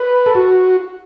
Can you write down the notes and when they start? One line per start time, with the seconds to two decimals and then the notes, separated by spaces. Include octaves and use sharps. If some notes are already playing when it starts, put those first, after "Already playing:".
Already playing: B4
0.26 A4
0.35 F#4